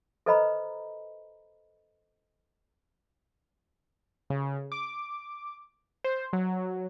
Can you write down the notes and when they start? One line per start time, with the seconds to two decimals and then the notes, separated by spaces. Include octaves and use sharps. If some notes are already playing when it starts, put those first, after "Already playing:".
0.26 A4 B4 C5 D#5 A#5 B5
4.30 C#3
4.72 D6
6.04 C5
6.33 F#3